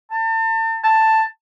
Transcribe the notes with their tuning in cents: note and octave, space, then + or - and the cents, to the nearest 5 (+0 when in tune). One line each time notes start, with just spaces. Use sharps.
A5 +35
A5 +5